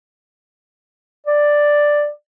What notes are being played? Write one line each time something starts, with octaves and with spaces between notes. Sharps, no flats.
D5